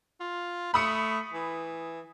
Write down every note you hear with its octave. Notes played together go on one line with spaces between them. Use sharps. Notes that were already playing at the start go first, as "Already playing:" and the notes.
F4
A3 B5 D#6 C#7
E3